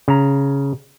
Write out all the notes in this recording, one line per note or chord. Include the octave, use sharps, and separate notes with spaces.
C#3 A#5